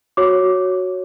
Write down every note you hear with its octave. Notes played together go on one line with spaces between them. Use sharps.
F#4 C#5 D6